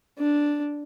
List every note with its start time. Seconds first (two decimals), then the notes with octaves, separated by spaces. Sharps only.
0.18 D4